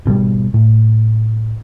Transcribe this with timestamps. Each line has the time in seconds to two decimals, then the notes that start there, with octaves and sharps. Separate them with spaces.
0.05 G#1 B2 D3 G3
0.54 A2